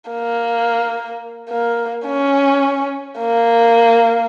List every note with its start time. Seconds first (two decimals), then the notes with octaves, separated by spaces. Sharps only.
0.11 A#3
1.50 A#3
2.07 C#4
3.19 A#3